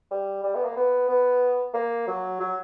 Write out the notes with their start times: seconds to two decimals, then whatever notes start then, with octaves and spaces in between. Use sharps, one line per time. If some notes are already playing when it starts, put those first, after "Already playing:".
0.11 G3
0.44 G3
0.55 B3
0.65 A#3
0.76 B3
1.09 B3
1.74 A#3
2.07 F#3
2.40 F#3